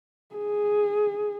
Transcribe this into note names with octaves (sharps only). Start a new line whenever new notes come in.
G#4